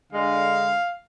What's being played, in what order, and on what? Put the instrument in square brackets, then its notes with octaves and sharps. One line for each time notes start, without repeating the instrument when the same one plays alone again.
[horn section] D3 G#3 [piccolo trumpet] F5